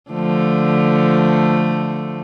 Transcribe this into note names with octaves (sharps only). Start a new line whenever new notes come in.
D3 F3 A3